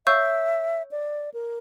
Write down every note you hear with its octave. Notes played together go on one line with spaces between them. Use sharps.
C#5 E5 F5 C#6 E6 G6
D5
A#4